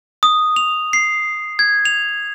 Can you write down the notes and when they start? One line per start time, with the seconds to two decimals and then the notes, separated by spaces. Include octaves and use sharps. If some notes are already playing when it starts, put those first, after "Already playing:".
0.23 D#6
0.56 F7
0.93 C7
1.59 G#6
1.85 F7